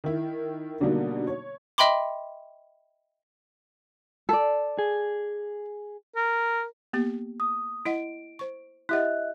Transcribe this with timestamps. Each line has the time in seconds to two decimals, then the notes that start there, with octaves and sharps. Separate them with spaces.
0.04 D#3 E4
0.80 B2 D3 F#3 G3 A#3 D#4
1.27 C#5
1.78 D#5 E5 G5 B5 C6 D6
4.29 A4 D5
4.79 G#4
6.16 A#4
6.93 A#3 B3 G4
7.40 D#6
7.86 E4 D#5 F#5 D7
8.39 C5 C#6
8.89 E4 G4 D#5 E5 F#5 F#6